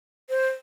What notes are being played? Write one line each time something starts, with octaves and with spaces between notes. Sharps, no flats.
C5